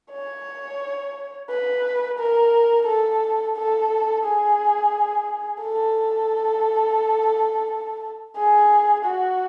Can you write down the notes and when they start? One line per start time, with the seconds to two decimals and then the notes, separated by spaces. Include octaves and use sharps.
0.12 C#5
1.49 B4
2.19 A#4
2.87 A4
3.56 A4
4.25 G#4
5.61 A4
8.36 G#4
9.05 F#4